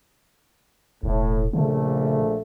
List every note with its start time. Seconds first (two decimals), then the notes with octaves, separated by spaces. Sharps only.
1.03 E1 A2
1.53 A#1 C#3 A3